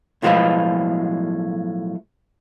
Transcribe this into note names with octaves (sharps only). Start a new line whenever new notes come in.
B1 A2 F3 G#3 F4 B4